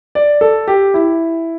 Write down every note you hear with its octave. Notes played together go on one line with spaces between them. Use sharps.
D5
A4
G4
E4